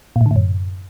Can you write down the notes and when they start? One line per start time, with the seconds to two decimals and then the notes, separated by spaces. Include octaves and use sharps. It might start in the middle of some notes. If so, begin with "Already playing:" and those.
0.16 A#2
0.21 A2
0.26 D3
0.31 A2
0.36 F#2